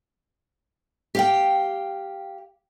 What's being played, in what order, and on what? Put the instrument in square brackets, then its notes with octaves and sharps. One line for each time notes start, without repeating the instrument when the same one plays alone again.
[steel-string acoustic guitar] G4 F5 G5